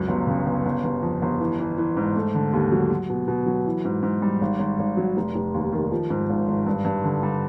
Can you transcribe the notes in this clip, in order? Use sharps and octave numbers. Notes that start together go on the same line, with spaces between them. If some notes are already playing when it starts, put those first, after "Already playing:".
Already playing: C#2 F#2
G1
C#3
G1
G1
G1
F2
G1
E3
E3
E3
G#2
A3
D3
D#2
F#3
F#3
B2
B2
F#3
E3
G#2
G#2
G3
G#1
G#1
G#1
F#3
F1
F1
D#2
D#3
F3
G#2
G#1
G#1
G2
G2
D3
G3